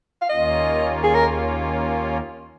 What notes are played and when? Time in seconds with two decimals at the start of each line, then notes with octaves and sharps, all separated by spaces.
0.21 F5
0.29 D#2 D#3 A#3 C#4 F4 D#5
1.04 G#4
1.14 A#4